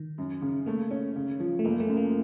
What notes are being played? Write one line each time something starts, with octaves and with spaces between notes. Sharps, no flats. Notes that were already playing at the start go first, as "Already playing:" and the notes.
Already playing: D#3
F#2
C#3
A3 A#3
C#4
C#3
F3
A3
F#1 A#3
A3
F#2
A#3